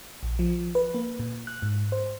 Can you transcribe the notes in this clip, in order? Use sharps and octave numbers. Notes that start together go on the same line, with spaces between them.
A#1
F3
B4
A#3
A#2
F#6
G#2
C5